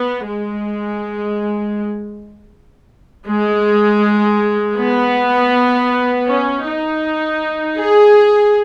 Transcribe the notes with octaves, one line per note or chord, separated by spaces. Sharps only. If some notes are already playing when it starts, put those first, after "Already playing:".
Already playing: B3
G#3
G#3
B3
C#4
D#4
G#4